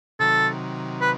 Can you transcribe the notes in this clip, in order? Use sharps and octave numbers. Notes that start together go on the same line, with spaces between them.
C3 D#3 F#3 A4
B4